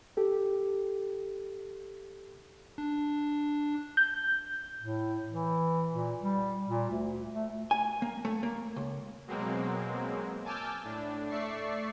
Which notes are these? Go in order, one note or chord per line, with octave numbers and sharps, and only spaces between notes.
G4 A4
D4
G6
A2
E3
A#2
G3
A#2
D2
A3
G#5
A#3
A3
A#3
C#2
B2 F#3 G#3 A#3 C4
G#5 A5 D6 E6 F6 G6
A2 D4
A3 D5 E5 C#6 C7